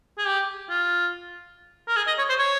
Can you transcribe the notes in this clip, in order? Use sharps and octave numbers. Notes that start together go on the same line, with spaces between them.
G#4
G4
F4
A#4
G#4
D#5
C#5
C5
C#5